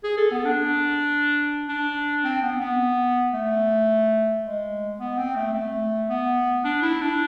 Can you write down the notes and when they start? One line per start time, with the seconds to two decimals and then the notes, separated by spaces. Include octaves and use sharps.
0.04 G#4
0.17 A4
0.31 B3
0.45 D4
1.68 D4
2.24 C4
2.43 B3
2.61 B3
3.34 A3
4.44 G#3
4.99 B3
5.18 C4
5.36 A3
5.54 A3
6.09 B3
6.64 D4
6.82 E4
7.01 D4